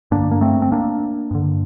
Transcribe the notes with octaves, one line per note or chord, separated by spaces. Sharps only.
G2 D3 A#3 D4
A#3
A3 C4
C4
A#3 D4
G2 D3